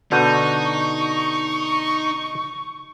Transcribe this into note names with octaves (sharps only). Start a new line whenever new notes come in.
B2 D3 D#4 A5 C#6 G6 D#7